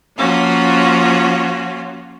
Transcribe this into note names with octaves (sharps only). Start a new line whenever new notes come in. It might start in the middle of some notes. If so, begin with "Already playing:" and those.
F3 A#3 C#4 F4 F#4